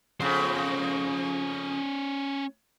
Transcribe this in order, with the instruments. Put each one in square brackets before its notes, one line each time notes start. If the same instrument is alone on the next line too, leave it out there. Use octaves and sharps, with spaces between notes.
[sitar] F2 C#3 [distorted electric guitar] C#4 C5